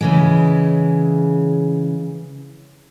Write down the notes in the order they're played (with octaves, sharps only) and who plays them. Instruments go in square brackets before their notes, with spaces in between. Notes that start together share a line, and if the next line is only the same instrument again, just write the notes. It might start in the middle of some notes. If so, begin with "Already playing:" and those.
[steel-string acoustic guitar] C#3 E3 G#3